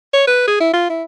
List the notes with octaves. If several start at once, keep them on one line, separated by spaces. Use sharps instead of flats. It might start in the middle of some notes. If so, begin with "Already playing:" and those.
C#5
B4
G#4
E4
F4
E4